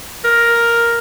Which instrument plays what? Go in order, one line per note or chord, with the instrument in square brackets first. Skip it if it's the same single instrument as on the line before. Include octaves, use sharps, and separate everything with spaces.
[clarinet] A#4